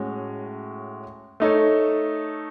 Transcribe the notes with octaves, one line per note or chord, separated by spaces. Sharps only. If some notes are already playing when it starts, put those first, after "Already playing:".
Already playing: A2 G#3 C#4 F#4
A3 D#4 A4 C#5